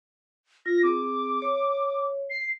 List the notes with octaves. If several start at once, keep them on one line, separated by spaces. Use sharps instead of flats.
F4 A#6
C4 G#4 D6
C#5
C7